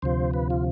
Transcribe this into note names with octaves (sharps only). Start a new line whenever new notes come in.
D2 C3 F3 C5
B4
F4